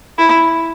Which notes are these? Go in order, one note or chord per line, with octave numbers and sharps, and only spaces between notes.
E4